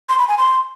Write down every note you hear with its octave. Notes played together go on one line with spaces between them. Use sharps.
C6
B5
G#5
C6